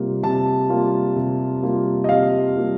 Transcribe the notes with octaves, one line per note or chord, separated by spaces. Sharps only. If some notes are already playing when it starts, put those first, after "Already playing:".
Already playing: C3 G3 A#3 F4
C3 A5
G3 A#3 F4
C3
G3 A#3 F4
D#5
C3 F5
G3 A#3 F4